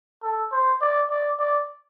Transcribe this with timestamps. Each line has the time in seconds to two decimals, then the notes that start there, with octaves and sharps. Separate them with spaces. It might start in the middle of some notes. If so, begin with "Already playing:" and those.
0.23 A4
0.52 C5
0.81 D5
1.10 D5
1.39 D5